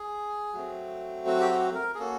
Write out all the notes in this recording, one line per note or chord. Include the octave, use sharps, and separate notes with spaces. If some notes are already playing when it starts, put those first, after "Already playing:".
Already playing: G#4
F#3 A3 C4
F#4
G4
F#4
A#4
G#4
A#3 C#4 F#4 A4